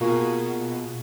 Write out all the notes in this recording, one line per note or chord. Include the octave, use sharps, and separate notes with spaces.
B2 A#3 F4 F#4 G#4 C#6